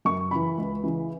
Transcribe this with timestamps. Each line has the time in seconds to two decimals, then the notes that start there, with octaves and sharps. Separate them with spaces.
0.05 F#2 C#6
0.31 C#3 E3 B5
0.57 C#2
0.83 C#3 E3